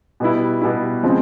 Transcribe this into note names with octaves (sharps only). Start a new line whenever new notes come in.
B2 G3 B3 E4
B2 G3 B3 E4
C#3 F3 G#3 C4